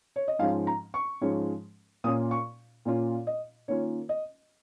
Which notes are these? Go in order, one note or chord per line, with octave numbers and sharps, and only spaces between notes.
C#5
D#5
G#2 F3 G#3 C#4 F5
A#5
C#6
G#2 F3 G#3 C#4
A#2 A#3 C#4 F4 D#6
C#6
A#2 A#3 C#4 F4
D#5
D#3 A#3 C#4 F4 C#5
D#5